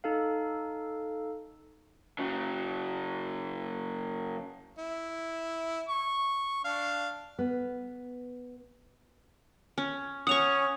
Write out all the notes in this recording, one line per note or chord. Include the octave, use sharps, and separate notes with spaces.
D#4 A4 F5
C#3 F#3
E4
C#6
D4 F5
B3
C#4
C#4 F#5 C#6 D#6 F7